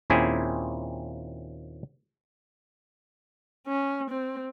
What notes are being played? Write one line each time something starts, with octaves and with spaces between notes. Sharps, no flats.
D#2 A#2 C4 C#4 E4 G#4
C#4
C4